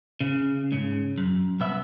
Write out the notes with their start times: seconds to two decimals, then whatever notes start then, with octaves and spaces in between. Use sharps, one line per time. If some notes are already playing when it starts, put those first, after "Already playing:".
0.21 C#3
0.72 G#2 C#3
1.18 F#2
1.60 C2 B3 E5